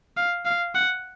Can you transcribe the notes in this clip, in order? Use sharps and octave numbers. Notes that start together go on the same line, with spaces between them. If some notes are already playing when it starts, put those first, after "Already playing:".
F5
F5
F#5